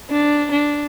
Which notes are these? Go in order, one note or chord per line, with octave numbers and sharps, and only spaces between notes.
D4
D4